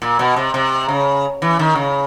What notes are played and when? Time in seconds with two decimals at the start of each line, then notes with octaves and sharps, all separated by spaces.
0.02 A#2
0.19 B2
0.36 C3
0.54 C3
0.89 C#3
1.42 E3
1.59 D#3
1.76 C#3